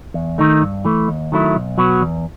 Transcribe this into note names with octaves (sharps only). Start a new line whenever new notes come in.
E2
D#3 A3 D#4
G2
E3 A3
D#2
D#3 F#3 A3 E4
B1
B2 F#3 B3 F#4
E2